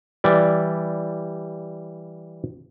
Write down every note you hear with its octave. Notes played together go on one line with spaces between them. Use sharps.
E3 G3 D5